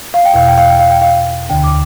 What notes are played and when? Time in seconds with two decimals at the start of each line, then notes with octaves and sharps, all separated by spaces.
0.14 F5
0.25 G5
0.34 E2 B2 F5
0.47 G5
0.58 F5
0.69 G5
0.79 F5
0.91 G5
1.02 F5
1.49 D2 D3 G5
1.64 D6